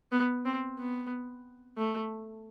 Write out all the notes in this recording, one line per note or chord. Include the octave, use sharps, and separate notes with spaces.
B3
C4
B3
A3